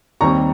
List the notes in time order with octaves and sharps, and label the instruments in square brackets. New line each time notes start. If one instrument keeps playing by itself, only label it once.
[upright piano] D#2 D#3 G3 C4 A#5 C#6